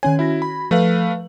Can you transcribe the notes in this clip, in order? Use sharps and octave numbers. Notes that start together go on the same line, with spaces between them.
D#3 C#4 C#5 G#5
E4 F#4 G#6 A#6
B5
F3 A3 B4 F5 F#7